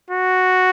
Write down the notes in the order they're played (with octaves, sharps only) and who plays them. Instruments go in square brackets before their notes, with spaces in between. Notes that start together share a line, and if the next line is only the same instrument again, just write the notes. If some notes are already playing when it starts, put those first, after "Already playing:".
[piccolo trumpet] F#4